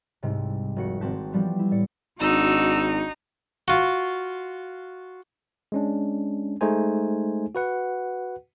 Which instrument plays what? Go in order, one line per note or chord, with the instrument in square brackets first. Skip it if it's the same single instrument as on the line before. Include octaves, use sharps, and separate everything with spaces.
[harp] C2 G#2 C3
F1 F#4 C#7
G#1 C4 F#4 A5 G6 B6
E3 F3 G3 B3
E4
A2 D5 C#7
[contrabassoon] G#1 [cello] D4 F#4 [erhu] D#4 [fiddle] E6
[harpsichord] F4 F#4
[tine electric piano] G#3 C#4 D4
G#3 A3 D#4 G#4 C5 G#5
F#4 B4 F#5